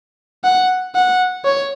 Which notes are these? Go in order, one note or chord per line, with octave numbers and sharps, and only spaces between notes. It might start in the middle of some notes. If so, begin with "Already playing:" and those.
F#5
F#5
C#5